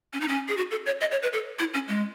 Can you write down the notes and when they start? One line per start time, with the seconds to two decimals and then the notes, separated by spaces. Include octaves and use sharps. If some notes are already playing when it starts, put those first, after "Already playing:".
0.13 C#4
0.21 D#4
0.28 C#4
0.49 G#4
0.57 F#4
0.71 A4
0.86 C#5
1.01 D#5
1.11 C#5
1.23 B4
1.33 A4
1.59 E4
1.74 C#4
1.88 G#3